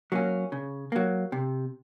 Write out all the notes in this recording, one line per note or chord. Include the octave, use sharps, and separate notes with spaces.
F#3 A#3 C#4
C#3
F#3 A#3
C3